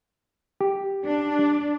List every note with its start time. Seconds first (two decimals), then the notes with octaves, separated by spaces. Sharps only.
0.61 G4
1.05 D4